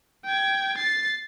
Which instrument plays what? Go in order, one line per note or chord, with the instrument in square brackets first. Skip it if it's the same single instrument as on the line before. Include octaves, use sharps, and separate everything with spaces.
[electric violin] G5 G#6
A6 C7